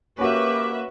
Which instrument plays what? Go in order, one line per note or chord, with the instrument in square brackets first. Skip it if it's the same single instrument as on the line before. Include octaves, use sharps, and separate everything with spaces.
[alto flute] A#3 [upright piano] C#4 F#4 [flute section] G4 C#6 D6 [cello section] B4 E5